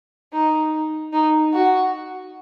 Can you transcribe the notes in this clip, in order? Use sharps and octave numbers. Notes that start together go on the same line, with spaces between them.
D#4
D#4
F#4